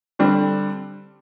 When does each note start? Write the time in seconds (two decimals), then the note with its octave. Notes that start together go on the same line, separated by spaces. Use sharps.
0.19 D3 G3 C4